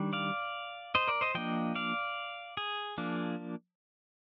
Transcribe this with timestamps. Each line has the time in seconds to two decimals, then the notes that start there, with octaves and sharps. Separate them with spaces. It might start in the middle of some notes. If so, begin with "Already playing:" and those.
Already playing: D#3 G3 D4
0.13 D5 F5
0.95 C5 D#5
1.08 A#4 D5
1.21 C5 D#5
1.35 F3 A#3 D4 D#5 G5
1.75 D5 F5
2.57 G#4
2.98 F3 A#3 D4